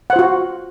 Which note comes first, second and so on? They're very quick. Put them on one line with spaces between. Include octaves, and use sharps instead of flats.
F#5 C5 F4 F#4